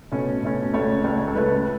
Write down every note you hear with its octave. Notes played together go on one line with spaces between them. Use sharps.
B2 A3 C#4
B2 A3 C#4
C#2 C#3 A3 C#5
C#2 C#3 A3
A4
C#2 C#3 A3 B4